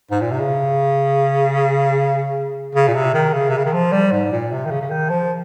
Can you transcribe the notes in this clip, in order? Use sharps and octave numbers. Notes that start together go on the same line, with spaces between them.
G#2
A#2
C3
C#3
C#3
A#2
C3
D#3
C#3
C3
C#3
D#3
F3
G3
G#2
A#2
C3
D#3
C#3
C#3
D#3
F3